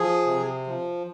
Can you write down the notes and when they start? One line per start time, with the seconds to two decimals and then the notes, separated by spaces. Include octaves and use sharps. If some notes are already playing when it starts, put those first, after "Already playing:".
Already playing: F3 G#4
0.26 C3
0.67 F3